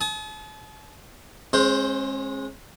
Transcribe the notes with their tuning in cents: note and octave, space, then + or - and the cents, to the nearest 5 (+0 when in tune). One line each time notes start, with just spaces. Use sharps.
A5 -40 D#6 +25
G#3 +0 C#4 -45 C5 +0